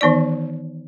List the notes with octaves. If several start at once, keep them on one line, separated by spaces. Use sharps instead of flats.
D#3 E3 B3 D#4 D5